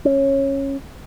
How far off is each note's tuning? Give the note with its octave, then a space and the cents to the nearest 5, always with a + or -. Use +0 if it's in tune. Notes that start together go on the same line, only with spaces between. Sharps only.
C#4 -15